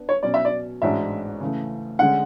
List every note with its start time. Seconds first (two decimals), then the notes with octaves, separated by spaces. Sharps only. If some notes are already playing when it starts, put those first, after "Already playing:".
Already playing: B3 D4
0.09 C#5
0.23 B2 F#3 C#4 D5
0.34 E5
0.45 D5
0.82 A1 G#2 G#3 D4 F#4 E5
1.40 C#3 E3 A3
1.99 D3 G#3 C#4 G#4 F#5